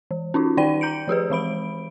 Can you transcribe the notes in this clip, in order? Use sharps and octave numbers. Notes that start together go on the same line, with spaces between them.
E3
C#4 D#4 F4 F#4
D#3 D#4 D5 G5 D#7
A#5 G6 C#7 D7
F3 G4 G#4 B4
E3 G#3 B5 D7